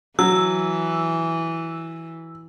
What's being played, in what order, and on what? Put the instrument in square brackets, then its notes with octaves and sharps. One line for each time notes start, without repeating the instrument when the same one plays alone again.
[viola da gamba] E3 [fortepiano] F#3 [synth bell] E6